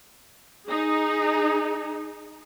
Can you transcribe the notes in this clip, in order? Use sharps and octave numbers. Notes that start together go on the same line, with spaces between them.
D#4 G#4